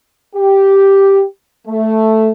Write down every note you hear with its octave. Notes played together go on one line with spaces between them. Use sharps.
G4
A3